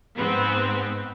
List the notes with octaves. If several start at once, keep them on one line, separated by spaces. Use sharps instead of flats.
G#2 B3 C4